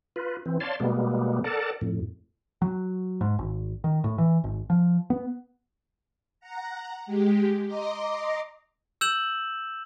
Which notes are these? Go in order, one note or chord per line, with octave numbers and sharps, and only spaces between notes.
F4 B4
E3 C4
C#5 D5 F5 A5 C6
B2 G3 G#3 A#3 B3
A4 A#4 D5 F#5 A5
F2 A2
F#3
G#2
G#1
D#3
A2
E3
G#1
F3
B3
F#5 A#5
G#3 G4
D#5 A#5 C6 D6
E6 G6 E7 F#7